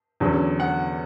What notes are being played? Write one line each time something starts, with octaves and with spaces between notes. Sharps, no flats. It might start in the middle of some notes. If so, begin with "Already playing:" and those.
E2 D3 F#3 C#4
F#5